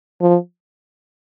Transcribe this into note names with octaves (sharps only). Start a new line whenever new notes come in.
F3